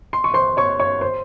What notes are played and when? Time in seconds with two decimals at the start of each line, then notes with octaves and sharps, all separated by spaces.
0.13 C6
0.24 C#6
0.34 C5 C6
0.57 C#5 C#6
0.80 C#5 C#6
1.01 C5 C6